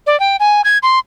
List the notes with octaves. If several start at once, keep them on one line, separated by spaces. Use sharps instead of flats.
D5
G5
G#5
G#6
C6